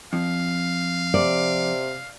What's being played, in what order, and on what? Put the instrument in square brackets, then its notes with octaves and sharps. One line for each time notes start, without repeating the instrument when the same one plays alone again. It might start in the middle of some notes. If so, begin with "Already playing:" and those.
[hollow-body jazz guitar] F2 [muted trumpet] F5
[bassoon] C3 [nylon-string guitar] D5